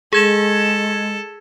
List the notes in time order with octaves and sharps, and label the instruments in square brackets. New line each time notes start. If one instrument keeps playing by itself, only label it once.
[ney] G#3 [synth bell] G#4 G#6 E7 [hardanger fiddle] A4